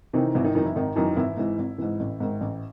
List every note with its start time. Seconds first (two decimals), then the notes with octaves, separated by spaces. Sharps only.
0.13 C3 D#3 E3 D#4
0.34 G#1 E3 E4
0.44 D#3 D#4
0.55 F#2 D#3 E3 D#4
0.65 E3 E4
0.76 G#1 D#3 D#4
0.96 F#2 D#3 E3 D#4
1.16 G#1 E3 E4
1.37 G#2 E3
1.58 G#1
1.78 G#2 E3
2.00 A1
2.20 G#2 D#3
2.41 A1